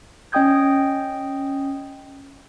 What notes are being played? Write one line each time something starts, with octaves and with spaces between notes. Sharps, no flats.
C#4 D#5 G5 D#6 G6 G#6